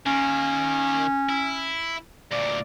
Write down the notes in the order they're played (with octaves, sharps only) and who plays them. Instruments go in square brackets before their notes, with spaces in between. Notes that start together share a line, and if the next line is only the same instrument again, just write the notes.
[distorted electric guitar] D#3 A#3 [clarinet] C#4
[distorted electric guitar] E4
[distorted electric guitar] D2 A#2 [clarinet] D5